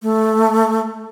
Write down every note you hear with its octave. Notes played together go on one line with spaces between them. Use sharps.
A3